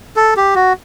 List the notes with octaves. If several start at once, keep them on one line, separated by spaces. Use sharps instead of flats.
A4
G4
F#4